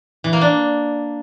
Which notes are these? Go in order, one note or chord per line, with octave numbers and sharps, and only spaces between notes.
E3
A#3
D4